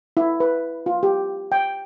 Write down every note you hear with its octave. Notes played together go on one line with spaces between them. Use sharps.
E4
B4
F4
G4
G5